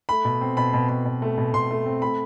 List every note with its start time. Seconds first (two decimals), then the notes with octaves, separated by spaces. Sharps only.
0.09 A3 B5
0.25 B2
0.41 C4
0.57 B2 B5
0.73 B2
0.89 B2
1.05 B2
1.22 A3
1.38 B2
1.54 B2 C6
1.71 A3
1.86 C4
2.02 A3 B5